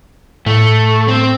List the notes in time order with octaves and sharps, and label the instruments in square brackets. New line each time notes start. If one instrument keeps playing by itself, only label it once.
[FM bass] A2 [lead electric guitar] A3
[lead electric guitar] C4